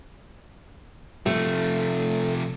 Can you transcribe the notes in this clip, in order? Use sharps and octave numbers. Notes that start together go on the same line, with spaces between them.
C3 F3 A3